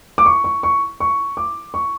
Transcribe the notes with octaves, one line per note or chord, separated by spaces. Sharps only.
D6
C#6
C#6
C#6
C#6
D6
C#6